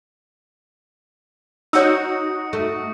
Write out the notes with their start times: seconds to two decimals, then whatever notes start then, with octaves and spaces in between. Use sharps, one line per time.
1.73 D#4 F#4 C#5 D#6 E6 C#7
2.53 A3 C#6